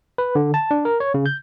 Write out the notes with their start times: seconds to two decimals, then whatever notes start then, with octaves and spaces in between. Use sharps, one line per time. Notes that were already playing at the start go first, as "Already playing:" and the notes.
0.18 B4
0.35 D3
0.54 A5
0.71 D4
0.85 A#4
1.00 C#5
1.14 C#3
1.26 G6